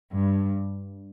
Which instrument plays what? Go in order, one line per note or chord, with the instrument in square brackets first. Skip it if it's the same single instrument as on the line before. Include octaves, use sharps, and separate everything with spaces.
[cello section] G2